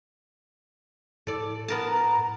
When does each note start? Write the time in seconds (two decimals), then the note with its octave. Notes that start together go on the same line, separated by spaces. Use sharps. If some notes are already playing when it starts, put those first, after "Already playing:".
1.27 A2 A4 D5
1.68 B3 A#4 A5
1.88 A#5